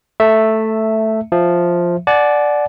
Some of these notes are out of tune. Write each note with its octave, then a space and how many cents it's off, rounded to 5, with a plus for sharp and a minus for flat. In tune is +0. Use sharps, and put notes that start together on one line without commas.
A3 +0 E5 +0 A5 +25
F3 +0 E5 +0
D5 +0 F#5 +0 A5 -45